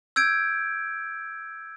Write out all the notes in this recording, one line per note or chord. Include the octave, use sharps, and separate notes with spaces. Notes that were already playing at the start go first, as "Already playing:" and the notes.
E6 G6 G#6 D7